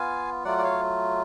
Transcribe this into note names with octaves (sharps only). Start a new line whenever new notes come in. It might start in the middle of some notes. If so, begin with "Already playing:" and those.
Already playing: B3 F4 F5 G#5
F#3 A3 F4 D5 F#5
D5
C#5 F5